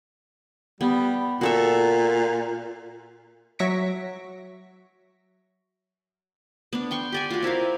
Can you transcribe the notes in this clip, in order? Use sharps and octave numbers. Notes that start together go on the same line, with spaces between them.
G3 B3
A#2 F#4 A4 E5
F#3 E5 C#6 A#6 B6 D7
B3 D4
G5 C6 C#6
G4 D5 G#5
F4 F#4
C4 E4 A#4 F5